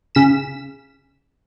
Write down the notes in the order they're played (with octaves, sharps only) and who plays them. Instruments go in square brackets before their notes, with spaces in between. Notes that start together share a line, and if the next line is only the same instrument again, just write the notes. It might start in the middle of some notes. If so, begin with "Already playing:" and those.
[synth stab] C#3 B6 E7